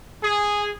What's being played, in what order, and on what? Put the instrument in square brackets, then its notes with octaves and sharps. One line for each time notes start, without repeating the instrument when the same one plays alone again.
[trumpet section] G#4